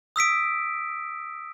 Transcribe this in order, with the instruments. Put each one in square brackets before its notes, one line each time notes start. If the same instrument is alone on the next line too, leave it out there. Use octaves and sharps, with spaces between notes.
[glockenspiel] D#6 E6 B6 D7